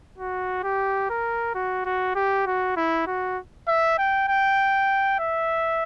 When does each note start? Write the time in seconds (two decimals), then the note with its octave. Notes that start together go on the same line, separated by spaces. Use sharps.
0.18 F#4
0.63 G4
1.10 A#4
1.55 F#4
1.85 F#4
2.15 G4
2.46 F#4
2.76 E4
3.07 F#4
3.68 E5
3.98 G5
4.28 G5
5.19 E5